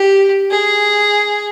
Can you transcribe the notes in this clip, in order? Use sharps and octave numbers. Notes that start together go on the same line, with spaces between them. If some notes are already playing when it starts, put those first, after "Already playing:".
Already playing: G4
G#4